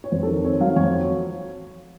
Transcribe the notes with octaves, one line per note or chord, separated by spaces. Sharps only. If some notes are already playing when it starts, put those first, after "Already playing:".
C#5
F2 C5
A4
D#3 A#4
C4 C#5
F#3 F5
F2 C#5